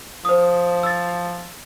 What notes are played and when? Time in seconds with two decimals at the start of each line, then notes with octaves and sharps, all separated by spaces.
0.25 F3 C5 D#6
0.83 E6 A6